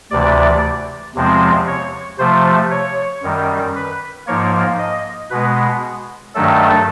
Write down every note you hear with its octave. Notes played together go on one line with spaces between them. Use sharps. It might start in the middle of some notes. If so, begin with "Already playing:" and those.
D2 C3 E3 D5
E2 C3 F3 G#3 C4
C#5
C3 F3 A3 C5
C#5
F#2 D#3 G3
B4
G#2 F3 A#3 C#5
D#5
B2 G#3 B3 B4
G2 D#3 F#3 A3 A4